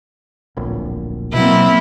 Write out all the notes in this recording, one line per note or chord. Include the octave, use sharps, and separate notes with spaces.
D1 A#1
B2 F#3 A#3 C4 E4